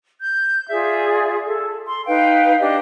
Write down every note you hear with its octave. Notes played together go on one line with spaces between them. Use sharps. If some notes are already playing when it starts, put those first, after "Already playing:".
G6
F4 G#4 D5 E5
A4
C6
D#4 B4 F5 G5
D4 G4 D#5